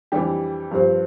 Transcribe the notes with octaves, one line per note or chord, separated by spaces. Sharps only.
F2 E3 G3 D4 G4
G2 F3 C4